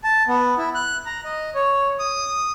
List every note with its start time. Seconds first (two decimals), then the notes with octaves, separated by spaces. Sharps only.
0.04 A5
0.28 B3
0.58 E4
0.75 F#6
1.06 A#5
1.25 D#5
1.55 C#5
1.99 D#6